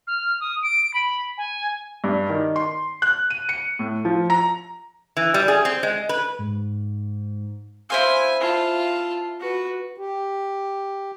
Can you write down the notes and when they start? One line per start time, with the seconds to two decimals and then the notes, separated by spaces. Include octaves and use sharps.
0.07 F6
0.41 D#6
0.63 D7
0.94 B5
1.38 G#5
2.04 G2
2.29 D#3
2.56 C6
3.02 F#6
3.30 D#7
3.49 C#7
3.79 A2
4.05 F3
4.30 A#5
5.17 E3
5.34 G3
5.48 G#4
5.65 C4
5.83 G#3
6.09 B4
6.39 G#2
7.90 E4 C5 F5 G#5
8.40 F4 A5
9.40 F#4 B4
9.98 G4